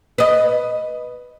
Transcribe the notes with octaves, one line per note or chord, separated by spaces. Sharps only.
B4 D#5